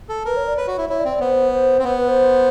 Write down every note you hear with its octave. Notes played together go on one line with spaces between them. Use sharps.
A4
A#4 B4
C#5
D5
B4 C#5
F#4
E4
E4 C#5
D5
C4
D5
B3 C5
C5
C4
B3 C5
B4
C5